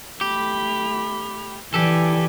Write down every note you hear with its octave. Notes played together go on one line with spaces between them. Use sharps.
A3 G4 B5
E3 G4 A4 D5 G#5